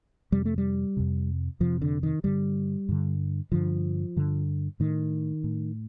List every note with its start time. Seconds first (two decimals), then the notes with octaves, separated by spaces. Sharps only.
0.32 F2 C3 G3
0.45 A3
0.58 G3
0.97 F2 C3
1.60 F2 C3 F3
1.82 D3
2.03 D#3
2.24 G2 D3 G3
2.89 G2 D3
3.52 G2 D3 F3
4.16 G2 D3
4.80 A2 D#3
5.44 A2